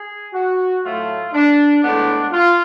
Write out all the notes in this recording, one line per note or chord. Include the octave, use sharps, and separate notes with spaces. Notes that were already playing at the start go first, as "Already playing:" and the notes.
Already playing: G#4
F#4
A2 F#3 A3 F4
D4
A2 G#3 B3 D4
F4